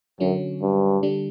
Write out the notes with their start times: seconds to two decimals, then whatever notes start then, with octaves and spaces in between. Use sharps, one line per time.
0.20 F#2 D3 F#3 C#4
0.61 G2
1.03 D3 G3 D4